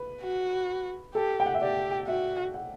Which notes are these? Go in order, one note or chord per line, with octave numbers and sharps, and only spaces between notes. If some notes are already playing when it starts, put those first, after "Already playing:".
Already playing: B4
F#4
G4 A4
G5
F#5
E5
G4 D5
F#4 E5
F#5